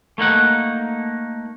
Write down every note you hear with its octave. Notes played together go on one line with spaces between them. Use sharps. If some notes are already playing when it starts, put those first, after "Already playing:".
A3 A#3 D#4 F#5